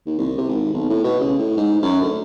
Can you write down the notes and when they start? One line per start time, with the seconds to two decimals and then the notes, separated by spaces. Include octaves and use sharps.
0.06 D#2
0.19 C2
0.38 C3
0.49 G#1
0.73 B1
0.90 A2
1.04 B2
1.21 C#3
1.39 A2
1.57 G#2
1.82 F#2
2.02 D2